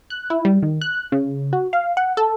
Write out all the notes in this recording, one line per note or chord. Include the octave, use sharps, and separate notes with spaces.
F#6
E4
G3
D#3
F#6
C#3
F#4
F5
F#5
A4